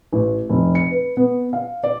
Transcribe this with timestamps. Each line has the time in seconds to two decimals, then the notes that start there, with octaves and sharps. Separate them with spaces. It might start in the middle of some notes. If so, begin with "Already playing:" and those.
0.12 A1
0.50 F1
0.75 C#7
0.91 B4
1.17 B3
1.53 F5
1.83 D5